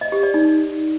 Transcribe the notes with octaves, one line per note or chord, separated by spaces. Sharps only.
D#5
G4
D5
D#4